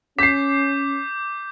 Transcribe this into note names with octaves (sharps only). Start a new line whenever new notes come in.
C#4 D6 G6 B6 C7